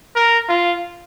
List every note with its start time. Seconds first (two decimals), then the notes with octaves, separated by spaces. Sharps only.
0.16 A#4
0.49 F4